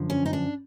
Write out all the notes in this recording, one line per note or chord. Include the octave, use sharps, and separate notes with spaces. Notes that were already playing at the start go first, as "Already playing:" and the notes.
Already playing: F#2 D3 F3
C#4
D#4
D4